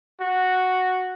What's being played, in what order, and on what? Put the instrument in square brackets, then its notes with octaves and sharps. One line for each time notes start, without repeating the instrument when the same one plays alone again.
[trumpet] F#4